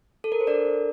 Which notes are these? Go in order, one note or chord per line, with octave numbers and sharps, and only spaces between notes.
A4
A#4
C5
D4 A4 A#4 D5